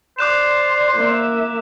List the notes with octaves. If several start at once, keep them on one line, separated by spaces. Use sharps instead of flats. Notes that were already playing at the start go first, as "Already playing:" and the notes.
C5 D5 C6 D6 F#6 E7
A#3 E5